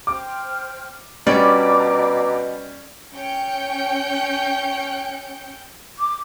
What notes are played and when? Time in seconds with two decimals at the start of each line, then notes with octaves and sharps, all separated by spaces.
0.07 C5 G5 D6 F6
1.27 B2 G3 C#4 D4 D5 A#5 D6
3.14 C#4 G5 G6 C#7
5.99 D6